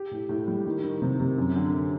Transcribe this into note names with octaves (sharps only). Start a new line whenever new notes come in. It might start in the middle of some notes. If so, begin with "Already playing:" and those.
Already playing: G4
A2
A2
G3
D#3
D#3
C3
C3
F#2
D3